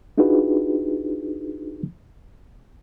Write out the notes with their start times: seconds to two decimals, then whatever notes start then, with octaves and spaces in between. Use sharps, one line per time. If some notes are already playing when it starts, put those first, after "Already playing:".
0.18 D4 D#4 F4 F#4 G#4 B4